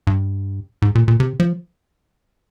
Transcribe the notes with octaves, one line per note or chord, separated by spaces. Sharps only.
G2
G#2
A#2
A#2
C3
F3